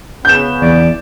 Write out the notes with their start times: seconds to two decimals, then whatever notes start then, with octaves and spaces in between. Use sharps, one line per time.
0.25 C#3 B3 C#4 G6 E7
0.62 E2 D5